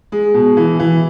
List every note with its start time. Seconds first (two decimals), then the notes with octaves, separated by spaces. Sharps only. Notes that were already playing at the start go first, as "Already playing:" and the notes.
0.12 G#3
0.34 B2
0.57 E3
0.80 E3